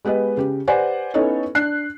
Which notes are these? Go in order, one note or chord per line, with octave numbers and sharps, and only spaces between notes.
G#3 B3 G4 B4 D#5
C#3 G4
G4 B4 C5 D5 F#5 G#5
B3 C#4 D#4 E4 A4 C#5
D4 F#6 C7